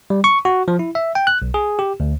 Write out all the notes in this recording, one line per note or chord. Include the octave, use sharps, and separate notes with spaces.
G3
C#6
F#4
F3
E4
E5
G5
F#6
B1
G#4
G4
D2